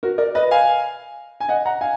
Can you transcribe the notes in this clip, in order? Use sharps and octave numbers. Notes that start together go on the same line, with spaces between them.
F#4 A#4
A#4 D5
B4 D#5
F5 G#5
G#5
D#5 F#5
F#5 A#5
F5 G#5